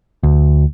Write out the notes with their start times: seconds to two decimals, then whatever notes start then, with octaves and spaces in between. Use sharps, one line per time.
0.23 D2